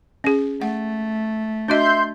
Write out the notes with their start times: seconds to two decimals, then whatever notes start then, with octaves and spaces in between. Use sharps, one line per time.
0.24 C#4 G#4
0.62 A3 F#5
1.68 D4 F#4 D#5 E5 C6 G6